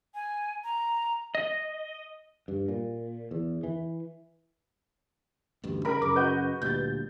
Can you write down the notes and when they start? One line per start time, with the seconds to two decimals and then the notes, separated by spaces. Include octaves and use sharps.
0.15 G#5
0.64 A#5
1.35 D#5
2.48 G2
2.68 A#2
3.31 E2
3.63 E3
5.64 A1 D2 G2
5.85 C#3 A#4 B5
6.02 F#2 C#3 D6
6.16 F#4 B4 D#5 G6
6.62 D2 A#2 G3 G6 A6